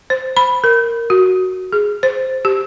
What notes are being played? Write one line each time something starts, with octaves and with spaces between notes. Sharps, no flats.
C5
B5
A#4
F#4
G#4
C5
G4